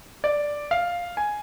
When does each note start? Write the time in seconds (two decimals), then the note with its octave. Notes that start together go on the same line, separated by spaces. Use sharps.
0.24 D5
0.71 F5
1.17 G#5